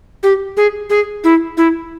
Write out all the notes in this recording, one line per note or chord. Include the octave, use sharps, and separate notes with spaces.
G4
G#4
G#4
E4
E4